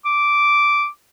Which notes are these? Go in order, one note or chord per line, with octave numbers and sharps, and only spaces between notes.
D6